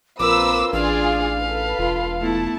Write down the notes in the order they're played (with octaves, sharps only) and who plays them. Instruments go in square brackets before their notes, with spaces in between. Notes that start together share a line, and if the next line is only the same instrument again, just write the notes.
[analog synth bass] A#1 [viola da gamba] C4 F4 [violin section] A#4 B4 E6 [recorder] D6
[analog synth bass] A1 [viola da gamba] D4 [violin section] F4 G#4 D5 [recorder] F5
[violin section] A4 B4
[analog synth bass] E1 [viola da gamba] F4
[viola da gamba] A3 B3 E4 [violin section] A5